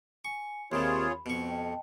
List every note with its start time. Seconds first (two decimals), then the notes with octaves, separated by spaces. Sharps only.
0.25 G#5 C#6
0.72 D#2 C3 D#3 F4 G#4 C#5 B5
1.26 F2 B2 C#6
1.48 D#5 G5 A5